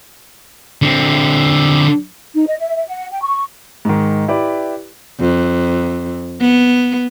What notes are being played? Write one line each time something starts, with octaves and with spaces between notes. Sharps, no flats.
D3 C4
D#4
D#5
E5
E5
F#5
G5
C#6
G#2 D#3
E4 G4 B4 D5
F2
B3